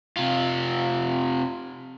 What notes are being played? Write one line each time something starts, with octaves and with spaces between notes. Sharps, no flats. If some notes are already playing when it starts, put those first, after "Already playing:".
C3 F4